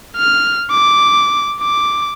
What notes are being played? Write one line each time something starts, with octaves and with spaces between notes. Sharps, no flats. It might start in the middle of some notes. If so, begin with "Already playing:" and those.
F6
D6
D6